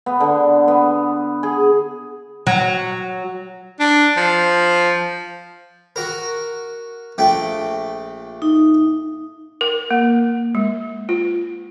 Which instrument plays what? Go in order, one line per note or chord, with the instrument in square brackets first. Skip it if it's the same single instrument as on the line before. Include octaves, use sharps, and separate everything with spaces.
[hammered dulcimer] B3
D3
B3
G#4
[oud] F#3
[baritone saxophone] D4
F3
[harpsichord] F#4 A#4
A#1 A3 G5
[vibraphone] D#4
[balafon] A#4
A#3
G#3
F4